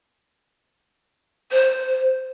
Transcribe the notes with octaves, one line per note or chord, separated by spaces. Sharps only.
C5